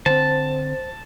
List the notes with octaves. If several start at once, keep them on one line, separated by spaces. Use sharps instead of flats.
D3 C4 C5 A5